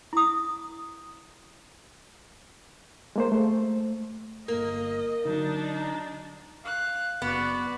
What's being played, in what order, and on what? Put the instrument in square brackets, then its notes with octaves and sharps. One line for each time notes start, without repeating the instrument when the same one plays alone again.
[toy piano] E4 D#6
[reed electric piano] G#3 A#3 C5
A3 C5
[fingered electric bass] D1 G1 [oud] A#3 [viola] D#5
[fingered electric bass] D3 F#3 [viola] D4 [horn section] D#4
[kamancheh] F5 F#6
[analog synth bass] F#1 [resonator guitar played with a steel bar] B3 [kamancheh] F#4 D5